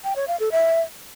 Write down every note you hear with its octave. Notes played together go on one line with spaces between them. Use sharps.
G5
C#5
F5
A4
E5